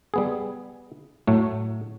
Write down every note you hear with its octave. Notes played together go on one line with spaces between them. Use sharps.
G3 B3 G#4
A2 F#3 A3